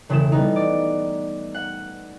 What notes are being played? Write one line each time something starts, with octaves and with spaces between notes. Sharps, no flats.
E1 C#3 A3 E4 E7
G3 B3 D#4
D5
F#5